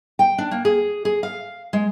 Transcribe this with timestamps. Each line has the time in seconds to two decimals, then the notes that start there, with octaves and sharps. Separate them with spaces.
0.19 G5
0.38 D4
0.51 A#3
0.65 G#4
1.05 G#4
1.23 F5
1.73 G#3